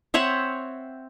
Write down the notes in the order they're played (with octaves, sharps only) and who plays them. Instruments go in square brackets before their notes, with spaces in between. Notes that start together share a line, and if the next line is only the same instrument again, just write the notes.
[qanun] C4 C#5 E5 F#5